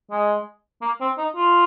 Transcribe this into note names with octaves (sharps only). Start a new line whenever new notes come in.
G#3
A#3
C4
D#4
F4